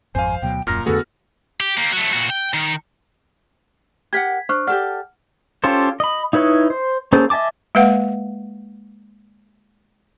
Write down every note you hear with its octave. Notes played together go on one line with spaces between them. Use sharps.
G#1 F2 C5 F5 G#5
D2 B2 F#3 G5
D#1 F#2 A#2 A#5 F6 A#6
F2 D3 A3 B3 F#4 G#4 A4
G4
A#3 G4
F#3 A3
A#2 F#4
G5
D#3
G4 A#4 F#5 G#6 B6
D4 C5 C#6 F6
G4 A4 D5 F#5 F6
C#4 F4 G4 A4 C5
D#5 B5
D#4 E4 B4 C#5 D#5
C5
A#3 C#4 G#4 A4 C5
D#5 E5 G#5 A5 D6
G#3 A#3 B4 F5 F#5